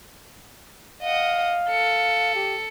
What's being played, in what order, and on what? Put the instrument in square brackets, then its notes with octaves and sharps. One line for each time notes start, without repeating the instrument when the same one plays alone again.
[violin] D#5 F#5 [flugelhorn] F5
[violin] A4 C#7
[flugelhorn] G4